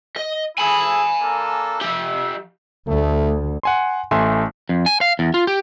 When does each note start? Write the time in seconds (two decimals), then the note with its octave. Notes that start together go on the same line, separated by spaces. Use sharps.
0.16 D#5
0.58 E4 G#4 A4 G#5 B5
1.20 A#3 D4 A4
1.82 F3 G4 E5
2.88 D2 A3
3.63 F#5 G#5 C6
4.11 A1 A3 E5 G#5 C6
4.69 F2
4.86 G#5
5.01 F5
5.19 E2
5.34 F4
5.47 G4